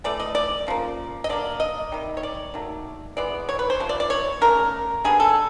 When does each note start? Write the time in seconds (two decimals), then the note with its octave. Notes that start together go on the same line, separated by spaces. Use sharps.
0.04 E3 A3 D5
0.20 D#5
0.35 D5
0.67 C#3 F3 A#3
1.24 D#5
1.29 D3 F#3 A#3 D5
1.60 D#5
1.92 C3 D#3 G3
2.17 C#5
2.23 D5
2.54 D#3 F#3 A3
3.17 E3 G#3 B3 D5
3.49 C#5
3.59 B4
3.70 C5
3.80 C3 F3
3.89 D5
4.00 D5
4.10 C#5
4.41 C#3 F#3 A3 A#4
5.04 D3 G3 B3 G#4
5.20 A4